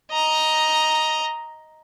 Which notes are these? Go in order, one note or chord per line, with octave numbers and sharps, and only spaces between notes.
D#5 A#5